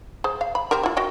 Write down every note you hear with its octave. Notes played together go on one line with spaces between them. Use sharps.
G#4 C5
F5
B5
C4 G4 A#4
E4 F4
F#4 D#5 G5